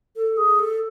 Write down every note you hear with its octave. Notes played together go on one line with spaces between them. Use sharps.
A4
G#4
A4